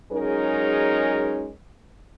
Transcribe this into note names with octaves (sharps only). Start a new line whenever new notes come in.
F#3 G#3 C#4 D#4 G#4 A#4